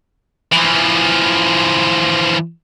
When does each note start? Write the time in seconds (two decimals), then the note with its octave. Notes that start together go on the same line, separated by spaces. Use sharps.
0.52 E3 F3